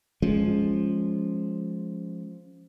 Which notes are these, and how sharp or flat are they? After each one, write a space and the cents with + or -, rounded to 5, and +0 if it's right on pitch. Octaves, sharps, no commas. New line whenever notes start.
F3 +0 G#3 +0 C#4 +0